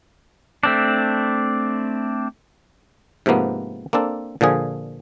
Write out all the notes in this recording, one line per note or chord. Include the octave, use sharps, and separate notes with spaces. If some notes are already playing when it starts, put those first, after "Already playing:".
A3 C4 D4
G#2 C3 F3 A#3 B3
A#3 C4 D4 A4
A#2 D3 F3 G#4